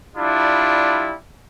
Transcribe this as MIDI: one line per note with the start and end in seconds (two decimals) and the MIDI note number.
0.16 1.14 55
0.16 1.14 62
0.16 1.14 64
0.16 1.14 65